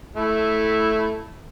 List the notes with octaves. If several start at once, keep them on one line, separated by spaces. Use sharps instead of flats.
A3 E4